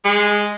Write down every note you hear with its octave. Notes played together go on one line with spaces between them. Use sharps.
G#3